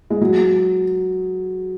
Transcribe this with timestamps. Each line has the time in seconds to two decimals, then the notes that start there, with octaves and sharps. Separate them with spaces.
0.10 G#3
0.21 F#3